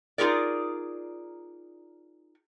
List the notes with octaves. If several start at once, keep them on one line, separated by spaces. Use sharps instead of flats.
D#4 F4 G#4 A#4 D5